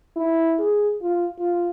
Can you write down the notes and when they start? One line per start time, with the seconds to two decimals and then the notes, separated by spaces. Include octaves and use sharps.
0.16 E4
0.59 G#4
1.02 F4
1.39 F4